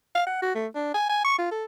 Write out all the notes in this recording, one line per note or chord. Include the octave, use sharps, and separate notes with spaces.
F5
F#5
F#4
A3
D4
G#5
G#5
C#6
F4
A4